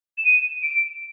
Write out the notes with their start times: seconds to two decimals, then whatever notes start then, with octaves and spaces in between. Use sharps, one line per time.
0.18 E7
0.25 D#7
0.63 D7